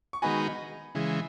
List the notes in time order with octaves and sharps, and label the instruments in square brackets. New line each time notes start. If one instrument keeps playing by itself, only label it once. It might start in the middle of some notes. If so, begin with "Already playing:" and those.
[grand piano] C#6
[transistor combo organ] D#3 G#3 B3 D#4 F#4 [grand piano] G#5 B5
[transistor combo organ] C#3 E3 G#3